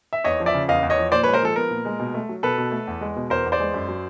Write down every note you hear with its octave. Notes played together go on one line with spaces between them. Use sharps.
E5
E2 C#5 D#5
F3
D5 E5
C#3
E2 D#5 F5
E2
C#5 D#5
F3
A#2 C5 D5
B4 C#5
G#3
A#4 C5
F3 A4
B3 A#4
A#2
G#3
B2
A3
F#3
B2 A4 B4
B2
A3
E2
G#3
B2
E2 A#4 C5
E2
C5 D5
G#3
F#2
F#3